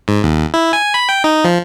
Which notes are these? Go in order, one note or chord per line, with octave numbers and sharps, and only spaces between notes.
G#2
D#2
E4
G#5
B5
G5
D#4
F3